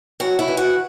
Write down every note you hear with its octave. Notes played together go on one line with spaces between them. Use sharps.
F#2 F#4
E4
E3
F#4